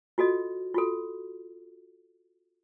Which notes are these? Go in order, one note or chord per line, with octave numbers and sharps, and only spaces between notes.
F4 F#4 A4 D#5
F4 F#4 A4